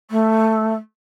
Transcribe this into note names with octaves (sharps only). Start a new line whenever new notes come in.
A3